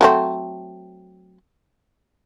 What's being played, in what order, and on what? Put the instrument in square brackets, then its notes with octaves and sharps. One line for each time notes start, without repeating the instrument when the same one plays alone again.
[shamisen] F#3 A3 C4